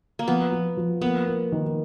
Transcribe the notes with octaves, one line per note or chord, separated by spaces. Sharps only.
A#3
F3 B3
F3
F3
A#3 B3
A#3
D#3